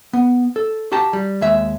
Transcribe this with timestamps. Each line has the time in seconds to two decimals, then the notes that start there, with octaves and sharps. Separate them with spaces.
0.13 B3
0.56 A4
0.92 F#4 G4 G5 A5 A#5
1.13 G3
1.41 D#2 G#3 E5